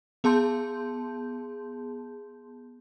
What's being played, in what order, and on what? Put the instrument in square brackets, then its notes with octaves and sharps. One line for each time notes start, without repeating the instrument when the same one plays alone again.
[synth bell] B3 G#4 A5 C6 G6